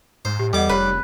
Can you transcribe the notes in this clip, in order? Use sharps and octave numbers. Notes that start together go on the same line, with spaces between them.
G#2 C5
A2 G4
E2 G3 A4 D#5 F#5 D6
F1 G4 B4 C#5